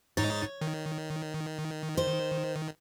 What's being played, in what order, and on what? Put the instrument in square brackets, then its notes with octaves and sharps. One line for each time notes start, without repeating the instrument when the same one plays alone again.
[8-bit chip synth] G#2 D#4 A6 [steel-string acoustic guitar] C#5
[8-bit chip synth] D#3
[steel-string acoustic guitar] C5